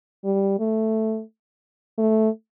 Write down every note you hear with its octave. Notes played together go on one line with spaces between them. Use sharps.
G3
A3
A3